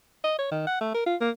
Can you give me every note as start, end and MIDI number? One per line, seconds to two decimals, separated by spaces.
0.24 0.34 75
0.39 0.49 73
0.52 0.63 51
0.67 0.80 78
0.81 0.94 57
0.94 1.05 70
1.07 1.16 65
1.21 1.30 58